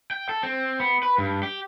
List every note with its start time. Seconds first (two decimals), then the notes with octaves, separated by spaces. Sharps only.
0.11 G5
0.29 A4
0.43 C4
0.80 B3
1.03 B4
1.18 G2
1.43 G4